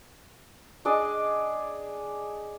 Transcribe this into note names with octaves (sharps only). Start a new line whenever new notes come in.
D4 G#4 D5 D#5